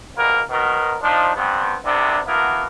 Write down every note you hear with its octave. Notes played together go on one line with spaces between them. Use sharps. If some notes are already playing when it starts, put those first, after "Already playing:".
C2 B2 G#3 A#3 B3 A#4
B2 D#3 F#3 B3 A#4
F3 D4 D#4
G2 B3 C4
C2 C3 B3 D4
A#3 B3 D4 E4 F#4 A#4